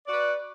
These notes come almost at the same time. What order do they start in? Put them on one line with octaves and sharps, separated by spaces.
D5 F#4 B4